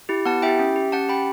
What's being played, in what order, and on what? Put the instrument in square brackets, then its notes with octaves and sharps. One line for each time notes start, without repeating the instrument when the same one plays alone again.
[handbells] E4 G4
B3 F#5 A5
E4 G4 E5 G5
C#4
G4
C#4 F#5 A5
G4 G5 B5